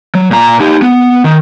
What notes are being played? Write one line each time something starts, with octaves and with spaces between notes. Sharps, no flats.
F#3
A#2 A#5
D#4 G4
B3
D#3